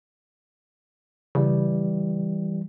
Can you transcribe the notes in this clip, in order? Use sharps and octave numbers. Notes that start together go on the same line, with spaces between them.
C#3 E3 G3